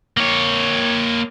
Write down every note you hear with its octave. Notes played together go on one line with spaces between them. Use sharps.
A#3 C#5